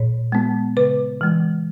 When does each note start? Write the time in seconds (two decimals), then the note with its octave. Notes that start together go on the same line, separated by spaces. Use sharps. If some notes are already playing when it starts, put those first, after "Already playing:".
Already playing: A#2 C#5
0.32 G#3 B3
0.77 C#3 B4
1.21 E3 G#3